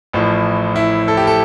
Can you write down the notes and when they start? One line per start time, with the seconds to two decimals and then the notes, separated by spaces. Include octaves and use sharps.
0.13 A1 A2 F3
0.76 E4
1.08 A4
1.17 G4
1.27 A4